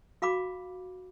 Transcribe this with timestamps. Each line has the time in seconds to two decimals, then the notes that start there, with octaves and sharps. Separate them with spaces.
0.22 F#4 F5 B5 D6